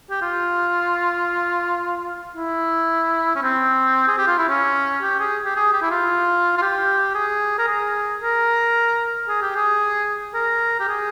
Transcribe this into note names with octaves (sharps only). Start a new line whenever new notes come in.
G4
F4
E4
C#4
C4
G#4
G4
F4
E4
C#4
G4
G#4
G4
G#4
G4
E4
F4
F4
G4
G#4
A#4
G#4
A#4
G#4
G4
G#4
A#4
G4
G#4